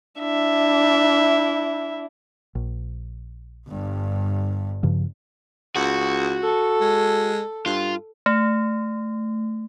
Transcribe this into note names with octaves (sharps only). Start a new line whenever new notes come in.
D4 E4 E5
A#1
G1 G2
G2 C#3 F3
C#2 F#4
A4
G#3
G2 F4
A3